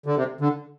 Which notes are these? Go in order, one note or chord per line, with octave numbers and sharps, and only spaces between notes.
D3
C3
D3